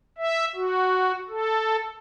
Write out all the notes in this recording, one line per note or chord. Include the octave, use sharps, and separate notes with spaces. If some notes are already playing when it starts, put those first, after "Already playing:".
E5
F#4
A4